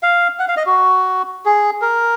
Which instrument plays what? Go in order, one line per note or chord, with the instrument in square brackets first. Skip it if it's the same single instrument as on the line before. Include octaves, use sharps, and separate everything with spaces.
[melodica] F5
F#5
F5
D#5
F#4
G#4
A#4